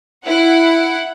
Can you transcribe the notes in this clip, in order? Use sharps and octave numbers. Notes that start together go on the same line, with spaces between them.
E4 F#5